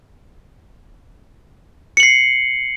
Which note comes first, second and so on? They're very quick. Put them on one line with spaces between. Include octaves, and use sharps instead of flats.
C#7 F#7 C7